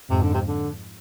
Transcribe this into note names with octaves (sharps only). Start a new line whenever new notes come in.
F2 G#2 C3
D3
C3
D3